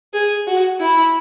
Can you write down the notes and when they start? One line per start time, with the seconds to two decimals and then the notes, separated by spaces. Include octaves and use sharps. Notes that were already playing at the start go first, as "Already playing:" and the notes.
0.13 G#4
0.47 F#4
0.80 E4